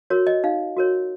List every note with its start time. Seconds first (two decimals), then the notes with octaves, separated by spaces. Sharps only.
0.10 F#4 A#4 C#5
0.27 D#5
0.44 D#4 F5
0.77 F#4 A#4 C#5